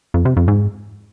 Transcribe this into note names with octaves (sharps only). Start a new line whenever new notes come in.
F2
C3
F2
G#2